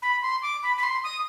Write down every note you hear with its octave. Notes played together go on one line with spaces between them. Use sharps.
B5
C6
D6
B5
B5
C6
D#6